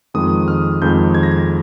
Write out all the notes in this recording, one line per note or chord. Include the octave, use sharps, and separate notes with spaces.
F2 D#3 G#3 D#6
F6
F2 D#3 G#3 G6
G#6
A#6
G#6